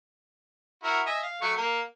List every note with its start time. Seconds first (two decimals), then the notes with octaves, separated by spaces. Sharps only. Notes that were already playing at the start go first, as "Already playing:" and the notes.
0.83 E4 F#4 A#4
1.06 D#5 E5 G#5
1.23 F5
1.42 F#3 A3 C#6
1.57 A#3